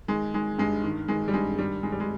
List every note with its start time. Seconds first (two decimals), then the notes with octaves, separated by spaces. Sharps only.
0.08 D#3 G#3
0.34 D#3 G#3
0.58 G2 G#3
0.84 D#3
1.08 D#3 G#3
1.28 G3
1.34 G2 G#3
1.59 D#3 G3
1.83 D#3 G#3
1.92 G3
2.00 G#3